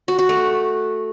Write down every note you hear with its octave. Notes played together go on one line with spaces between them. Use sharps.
F#4
F#4
A3